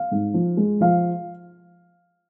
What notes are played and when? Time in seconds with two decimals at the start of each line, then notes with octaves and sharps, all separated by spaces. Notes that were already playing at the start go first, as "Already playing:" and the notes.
Already playing: F5
0.11 G#2
0.34 F3
0.57 G#3
0.81 F3 F5